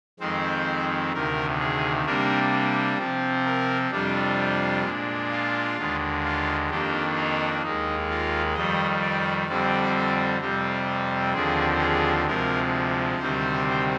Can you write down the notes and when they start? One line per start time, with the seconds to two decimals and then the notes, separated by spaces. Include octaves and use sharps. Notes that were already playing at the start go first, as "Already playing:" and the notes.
0.20 F2 D#3 G#3 C4 C5
1.13 D2 C3 D#3 A#4
1.60 G#4
2.05 C3 G3 A#3 D4 A#4
2.98 C3 F3 C4
3.45 A#4
3.91 F2 C3 G3 D4 F4
4.84 A#2 G#3 D4
5.31 F4
5.77 D#2 D3 G#3
6.24 F4
6.70 F2 D#3 A#3 D4 G4
7.16 D#4
7.63 D#2 D#3 G#3 D#4
8.09 F4
8.55 F2 D#3 G3 D#5
9.01 D5
9.48 F2 D3 G3 C4 D5
10.41 F2 C3 G3 C4
11.34 D#2 D3 F3 C4 G#4
11.81 G#4
12.26 D2 C3 F3 G#3 A#4
13.19 D2 C3 D#3 G3 C4 C5